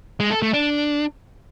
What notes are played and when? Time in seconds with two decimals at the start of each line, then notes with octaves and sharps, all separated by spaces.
0.20 G#3
0.31 A4
0.42 A3
0.54 D4